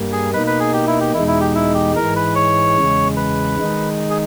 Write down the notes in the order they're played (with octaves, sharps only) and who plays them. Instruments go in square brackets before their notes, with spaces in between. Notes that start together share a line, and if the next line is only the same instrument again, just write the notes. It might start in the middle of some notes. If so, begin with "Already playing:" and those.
Already playing: [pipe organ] G2 G3 A#3
[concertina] G#4
[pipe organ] B2 A#3 D#4 [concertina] B4
[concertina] B4
G#4
G4
E4
G4
[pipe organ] E2 B2 G#3 D#4 [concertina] E4
[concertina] E4
G4
E4
G4
[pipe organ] G#2 E3 G#3 [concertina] A#4
[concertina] B4
C#5
[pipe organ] E2 C#3 G#3
[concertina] B4
[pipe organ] D#3 G#3 D#4
[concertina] G#4